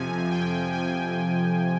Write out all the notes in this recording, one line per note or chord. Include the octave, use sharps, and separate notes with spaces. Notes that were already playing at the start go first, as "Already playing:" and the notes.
Already playing: F2 C3 F3 G#5
G5
G#5